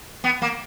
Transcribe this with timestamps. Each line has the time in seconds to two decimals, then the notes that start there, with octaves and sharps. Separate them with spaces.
0.24 B3
0.42 A#3